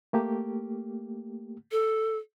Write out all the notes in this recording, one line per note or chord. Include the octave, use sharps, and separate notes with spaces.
A3 A#3 G4
A4